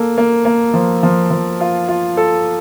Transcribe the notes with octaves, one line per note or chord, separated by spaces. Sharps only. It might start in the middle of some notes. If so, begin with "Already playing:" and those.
Already playing: A#3 A4
A#3
A#3
F3
F3
F3
F4
F4
A4